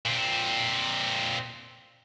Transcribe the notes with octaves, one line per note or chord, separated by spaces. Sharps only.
A#2 C4